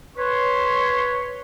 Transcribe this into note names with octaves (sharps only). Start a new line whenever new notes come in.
B4 C#5 C6